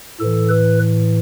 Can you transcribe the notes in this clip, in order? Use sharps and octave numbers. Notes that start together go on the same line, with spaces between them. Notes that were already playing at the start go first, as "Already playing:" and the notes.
A2 E3 A4
B4